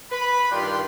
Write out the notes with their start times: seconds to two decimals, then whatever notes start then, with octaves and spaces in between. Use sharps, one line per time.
0.11 B4 B5
0.52 G2 D#3 D4 F4 G5 C6